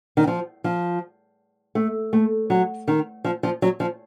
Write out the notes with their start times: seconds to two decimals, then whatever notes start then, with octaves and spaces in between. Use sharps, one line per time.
0.17 D#3
0.27 F3
0.64 F3
1.75 A3
2.13 A3
2.50 F#3
2.88 D#3
3.24 F3
3.43 F3
3.62 F#3
3.80 F3